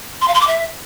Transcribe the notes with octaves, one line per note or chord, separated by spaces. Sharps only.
C6
F5
C6
D6
E5